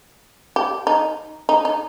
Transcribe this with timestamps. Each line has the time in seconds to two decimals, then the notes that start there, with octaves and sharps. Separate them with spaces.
0.56 G4
0.87 D#4
1.49 D#4
1.65 D#4